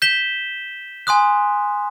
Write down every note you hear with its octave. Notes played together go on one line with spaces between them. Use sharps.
G6 B6 E7 G7
G#5 C6 D#6 F#6